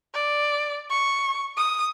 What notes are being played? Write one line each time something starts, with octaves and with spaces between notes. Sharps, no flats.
D5
C#6
D#6